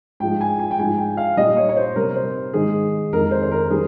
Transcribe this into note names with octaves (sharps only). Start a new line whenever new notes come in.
G#2 F3 G#3 G5
G#5
G#5
G5
G#2 F3 G#3 G#5
G5
F5
A#2 G3 D#5
C#5
C#5
C5
C3 G3 A#4
C5
G#2 D#3 G#3 G#4
F2 D#3 G#3 A#4
C5
C5
A#4
D#3 G3 G#4